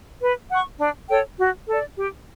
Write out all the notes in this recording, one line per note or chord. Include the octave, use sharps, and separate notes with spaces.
B4
F#5 C#6
D4
A4 C#5 G5
F#4
A4 D5
G4